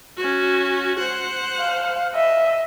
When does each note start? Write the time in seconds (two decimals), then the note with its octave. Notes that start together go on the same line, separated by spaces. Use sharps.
0.17 C#4 F#4
0.99 C5 F#5
1.60 F5
2.15 D#5 E5